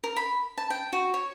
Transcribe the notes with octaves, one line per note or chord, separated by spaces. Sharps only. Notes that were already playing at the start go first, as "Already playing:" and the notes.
A#4
B5
A5
G5
F#4
C#5